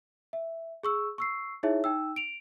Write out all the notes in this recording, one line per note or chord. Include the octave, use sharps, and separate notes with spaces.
E5
G#4 C#6 E6
C#6 E6 C7
D#4 E4 G#4 C#5 E5
D#4 G5 E6
D7 F7